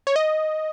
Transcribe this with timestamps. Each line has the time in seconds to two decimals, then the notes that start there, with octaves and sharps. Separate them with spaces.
0.07 C#5
0.16 D#5